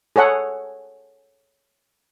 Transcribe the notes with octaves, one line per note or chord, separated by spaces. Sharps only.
G#4 A4 C#5 F#5